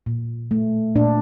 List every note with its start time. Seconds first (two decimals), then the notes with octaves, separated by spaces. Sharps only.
0.06 A#2
0.51 A3
0.95 A#2 D4